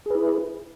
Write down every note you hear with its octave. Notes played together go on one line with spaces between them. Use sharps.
E4 G#4 B4